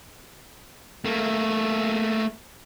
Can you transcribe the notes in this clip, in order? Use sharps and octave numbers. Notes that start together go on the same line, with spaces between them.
A3 A#3